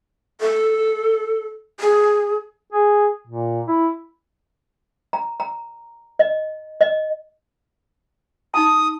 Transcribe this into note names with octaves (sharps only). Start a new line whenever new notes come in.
A4
G#4
G#4
A#2
E4
A#5
A#5
D#5
D#5
D#4 A5 D#6